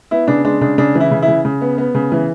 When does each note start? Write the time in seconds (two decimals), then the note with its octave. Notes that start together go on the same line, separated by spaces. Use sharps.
0.11 B3 E4
0.28 C#3 D4
0.45 G#3 D4
0.61 C#3 D4
0.78 C#3 D4
0.95 E3
1.00 E4
1.11 C#3
1.22 E4
1.28 C#3
1.45 C#3
1.61 B3
1.78 B3
1.95 C#3
2.12 E3